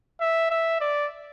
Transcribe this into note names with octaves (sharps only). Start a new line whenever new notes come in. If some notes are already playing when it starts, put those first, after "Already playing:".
E5
E5
D5